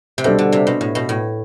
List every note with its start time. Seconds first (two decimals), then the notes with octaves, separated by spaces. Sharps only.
0.18 C3
0.24 B2 G3 D4 A4 C5
0.39 D3
0.52 C3
0.67 B2
0.81 A2
0.95 B2
1.09 A2